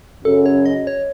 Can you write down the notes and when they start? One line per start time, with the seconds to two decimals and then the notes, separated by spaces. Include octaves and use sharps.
0.25 F#2 C#3 F#3 C#4 A4
0.46 C#5
0.66 D#5
0.87 C#5